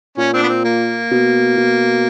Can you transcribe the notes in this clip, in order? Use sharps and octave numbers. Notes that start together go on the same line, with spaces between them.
A#2 C#4
C4 D4
B3
C4
A#3
B2
B2